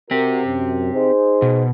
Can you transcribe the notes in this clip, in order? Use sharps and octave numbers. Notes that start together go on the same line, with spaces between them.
C4 F#4 G4 A#4
F#2
D#4 G#4 C5
B2